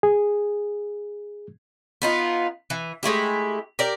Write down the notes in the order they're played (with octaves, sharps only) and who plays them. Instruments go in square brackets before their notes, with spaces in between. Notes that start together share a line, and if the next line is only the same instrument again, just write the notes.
[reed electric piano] G#4
[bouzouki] B3 D#4 F4
E3
G#3 A3 E4 G4
G4 A#4 D5